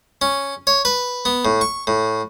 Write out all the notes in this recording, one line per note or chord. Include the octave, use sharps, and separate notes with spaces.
C#4
C#5
B4
B3
A2
C#6
A2